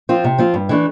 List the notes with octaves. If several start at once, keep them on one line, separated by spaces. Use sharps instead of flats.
F3 C4 F4
C3
F3 C4 F4
G2
E3 A3 D4